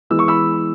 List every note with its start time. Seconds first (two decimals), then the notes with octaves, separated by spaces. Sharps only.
0.10 E3 G#3 B3 E6
0.19 C#6
0.28 B5 E6